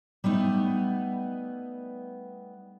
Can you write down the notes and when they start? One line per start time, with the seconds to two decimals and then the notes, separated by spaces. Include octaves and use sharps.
0.24 G3 A3 B3 D#4